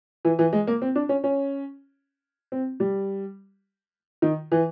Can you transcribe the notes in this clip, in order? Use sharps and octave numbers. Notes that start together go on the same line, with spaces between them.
E3
E3
G#3
A#3
C4
D4
C#4
C#4
C4
G3
D#3
E3